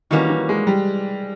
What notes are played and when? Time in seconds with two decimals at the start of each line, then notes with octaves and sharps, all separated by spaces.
0.11 D#3 E3 G3 A#3 C#4 F#4
0.29 E3
0.49 G#3
0.67 G3